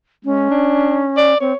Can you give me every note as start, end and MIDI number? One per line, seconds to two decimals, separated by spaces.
0.25 0.47 56
0.25 1.34 61
0.50 1.03 62
1.17 1.39 74
1.41 1.53 60
1.41 1.57 73